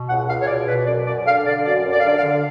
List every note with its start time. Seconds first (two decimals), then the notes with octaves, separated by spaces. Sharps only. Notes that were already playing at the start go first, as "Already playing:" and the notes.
Already playing: B2
0.09 C#2 F#5
0.28 C#2 F5
0.42 C#5
0.48 B2 D5
0.68 B2 B4
0.87 F#2 D5
1.07 F#2 D5
1.26 D3 F5
1.46 D3 D5
1.65 F#2 D5
1.86 F#2
1.92 D5
2.00 F5
2.05 D3 D5
2.18 F5
2.24 D3